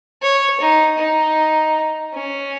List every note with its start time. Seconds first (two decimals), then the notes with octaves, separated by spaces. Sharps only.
0.22 C#5
0.61 D#4
0.98 D#4
2.14 C#4